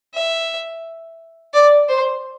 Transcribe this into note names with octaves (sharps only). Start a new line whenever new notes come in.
E5
D5
C5